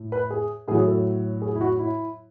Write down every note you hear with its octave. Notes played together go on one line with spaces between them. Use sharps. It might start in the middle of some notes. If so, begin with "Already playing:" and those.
Already playing: A2
B4
G#4
A2 F#3 G#4
A4
G#4
E4
F#4
E4